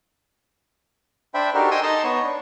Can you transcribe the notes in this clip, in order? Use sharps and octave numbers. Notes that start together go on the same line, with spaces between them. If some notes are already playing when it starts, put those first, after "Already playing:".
D4 C5 E5 G5 B5
D4 D#4 F#4 G4 A4 A#4
D#5 G5 G#5 C6 D#6 E6
D#4 D#5 A5 A#5 C6
B3 C#5
D4